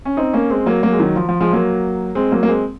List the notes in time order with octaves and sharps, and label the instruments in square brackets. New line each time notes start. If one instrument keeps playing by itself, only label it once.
[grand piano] C#4
C4 D#4
A#3 C#4
G#3 C4
F#3 A#3
F#3 A#3
G#3
D#3 F#3
F3
F3
F3 G#3
F#3 A#3
G#3 C4
F#3 A#3
A#3
G#3 C4